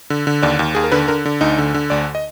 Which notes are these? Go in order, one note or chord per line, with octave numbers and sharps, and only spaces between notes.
D3
D3
D#2 D5
D#2
D#2 G#4
A#4
D3 B4
D3 A#4
D3
D2 D#4
D3
D3
D2 D5
D#5